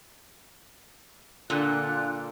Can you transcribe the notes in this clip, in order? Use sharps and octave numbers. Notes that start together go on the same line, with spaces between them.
A#2 D3 D4 F4 F#6